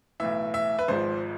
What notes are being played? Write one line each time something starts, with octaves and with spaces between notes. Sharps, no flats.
B1 A2 E3 E5
E5
B4
G#1 G#2 F3 C5